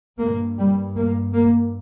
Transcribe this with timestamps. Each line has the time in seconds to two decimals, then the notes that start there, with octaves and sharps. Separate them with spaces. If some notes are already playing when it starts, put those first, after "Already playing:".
0.18 G2 A#3
0.57 G3
0.95 A#3
1.33 A#3